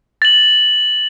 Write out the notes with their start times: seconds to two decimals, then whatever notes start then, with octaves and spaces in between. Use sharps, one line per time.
0.22 A6 F#7